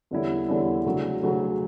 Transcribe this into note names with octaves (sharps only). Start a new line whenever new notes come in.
E2 D3 G3 C#4 E4
E2 D3 G3 C#4 E4
D2 C#3 F#3
D2 C#3 F#3